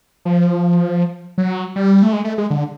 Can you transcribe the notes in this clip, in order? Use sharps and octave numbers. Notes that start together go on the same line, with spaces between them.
F3
F#3
G3
A3
G#3
A3
G#3
D3